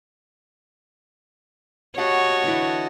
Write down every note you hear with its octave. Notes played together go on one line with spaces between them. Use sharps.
F#4 G4 C#5 D#5 F5 F#5 A5
D3 E3 E4